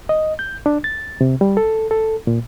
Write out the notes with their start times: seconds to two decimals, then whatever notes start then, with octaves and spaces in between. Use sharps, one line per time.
0.09 D#5
0.39 G6
0.66 D4
0.84 A6
1.21 C3
1.41 G3
1.57 A4
1.91 A4
2.27 A#2